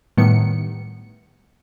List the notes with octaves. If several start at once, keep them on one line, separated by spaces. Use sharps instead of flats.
A2 D#3 G3 B3 C#7